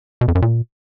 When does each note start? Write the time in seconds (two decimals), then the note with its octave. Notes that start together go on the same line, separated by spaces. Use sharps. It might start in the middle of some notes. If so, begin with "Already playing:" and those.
0.21 B2
0.28 F2
0.35 F#2
0.42 A#2